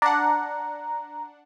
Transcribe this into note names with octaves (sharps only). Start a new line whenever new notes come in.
D4 F#5 A#5